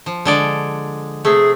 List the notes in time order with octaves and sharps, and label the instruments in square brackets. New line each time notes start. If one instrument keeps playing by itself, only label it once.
[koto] F3
D3 G#3 D5
[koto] C3 A3 [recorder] G#4